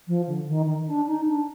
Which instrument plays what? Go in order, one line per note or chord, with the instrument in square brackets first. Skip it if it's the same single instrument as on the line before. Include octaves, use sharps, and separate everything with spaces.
[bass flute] F3
D3
D#3
D#3
D4
D#4
D4